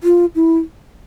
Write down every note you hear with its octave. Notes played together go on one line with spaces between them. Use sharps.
F4
E4